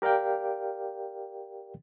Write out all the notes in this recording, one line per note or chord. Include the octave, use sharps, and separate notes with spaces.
G4 A#4 D5 F5 G5